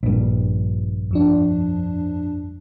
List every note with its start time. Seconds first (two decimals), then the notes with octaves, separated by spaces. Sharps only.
0.03 A#1 G2
1.11 F2 F3 D4